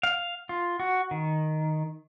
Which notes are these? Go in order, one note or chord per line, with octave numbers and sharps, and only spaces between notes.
F5
F4
F#4
D#3